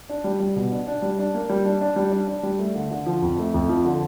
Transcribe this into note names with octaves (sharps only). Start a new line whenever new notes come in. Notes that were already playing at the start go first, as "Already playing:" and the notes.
D4
G3
G3
B2
D4
D4
G3
D4
A#3
G3
D4
D4
G3
D4
D4
G3
A3
D3
D3
F3
F2
A3
F2
F3
D3